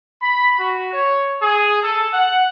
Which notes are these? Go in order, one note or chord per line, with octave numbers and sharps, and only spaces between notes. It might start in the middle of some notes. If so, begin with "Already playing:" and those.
B5
F#4
C#5
G#4
A4
F#5